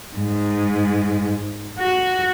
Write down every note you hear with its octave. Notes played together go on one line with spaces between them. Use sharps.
G#2
F#4